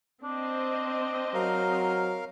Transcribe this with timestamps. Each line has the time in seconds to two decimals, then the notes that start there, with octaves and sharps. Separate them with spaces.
0.23 C4 D4 D#5
1.34 F#3 A#4 F5